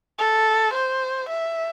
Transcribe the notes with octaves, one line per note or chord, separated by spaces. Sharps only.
A4
C5
E5